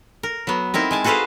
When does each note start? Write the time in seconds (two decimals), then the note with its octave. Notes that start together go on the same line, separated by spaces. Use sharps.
0.23 A#4
0.47 F#3 B3
0.74 C4 D#4 E4 A#4
0.91 G#3 G#5 A5
1.04 F#4 G#4 A4 B4 C5 F5